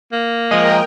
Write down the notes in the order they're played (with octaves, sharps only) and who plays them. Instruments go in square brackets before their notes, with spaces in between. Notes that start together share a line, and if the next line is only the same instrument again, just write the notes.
[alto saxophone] A#3
[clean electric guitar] F3 G#3 [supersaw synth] A#4 G5 [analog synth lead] D#5